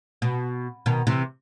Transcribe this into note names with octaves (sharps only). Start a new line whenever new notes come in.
B2
B2 D#3
C3 E3